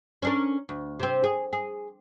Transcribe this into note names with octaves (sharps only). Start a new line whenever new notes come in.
C#4 D4 A#4
D2
C3 C4
G#4
G#4